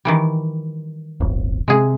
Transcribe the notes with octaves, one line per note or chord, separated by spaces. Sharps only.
D#3 E3 G3
D1 G1
C3 G#3 G#4